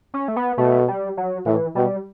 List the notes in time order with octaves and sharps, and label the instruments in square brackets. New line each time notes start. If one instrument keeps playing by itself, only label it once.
[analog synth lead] C#4
A3
B3
[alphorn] B2 [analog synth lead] A3
[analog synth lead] G3
F#3
[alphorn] A2 [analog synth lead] E3
[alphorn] B2 [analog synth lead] G3